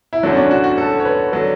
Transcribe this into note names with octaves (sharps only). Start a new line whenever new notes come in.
E4
D2 D3 F#3 D4
C#4
D4
F#4
F#4
A4
C#5
B4
D3 F#3